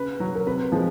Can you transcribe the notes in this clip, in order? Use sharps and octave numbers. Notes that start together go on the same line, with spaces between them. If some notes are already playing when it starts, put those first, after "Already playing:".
Already playing: C#3 B4
F#3
A#4
C3 B4
F3 G#3